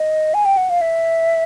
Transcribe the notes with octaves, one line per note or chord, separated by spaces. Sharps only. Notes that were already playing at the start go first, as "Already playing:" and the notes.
Already playing: D#5
G#5
G5
F#5
F5
E5